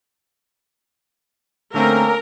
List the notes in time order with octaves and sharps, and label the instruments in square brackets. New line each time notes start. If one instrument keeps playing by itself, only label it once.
[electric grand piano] D3 A3 C4 [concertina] A#3 C#4 A4 [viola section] A#4